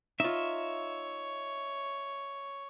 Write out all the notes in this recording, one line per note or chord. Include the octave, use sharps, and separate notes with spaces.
D#4 F4 C#5 E5